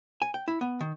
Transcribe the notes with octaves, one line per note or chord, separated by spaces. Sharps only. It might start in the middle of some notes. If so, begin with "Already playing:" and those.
G#5
G5
E4
B3
D#3